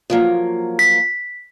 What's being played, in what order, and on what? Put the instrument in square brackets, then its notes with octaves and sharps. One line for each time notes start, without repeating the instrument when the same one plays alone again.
[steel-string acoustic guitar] F3 F#3 A#3
[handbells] B6